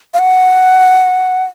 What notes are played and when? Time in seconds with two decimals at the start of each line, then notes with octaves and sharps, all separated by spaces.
0.14 F5
0.19 F#5